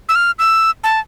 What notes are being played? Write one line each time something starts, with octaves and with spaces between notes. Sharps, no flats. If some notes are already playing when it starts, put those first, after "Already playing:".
E6
F6
E6
A5